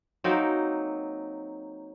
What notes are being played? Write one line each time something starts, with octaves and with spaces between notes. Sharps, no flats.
F#3 A#3 C4 D#4